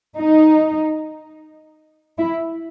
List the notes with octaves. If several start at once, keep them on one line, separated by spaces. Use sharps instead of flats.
D#4
E4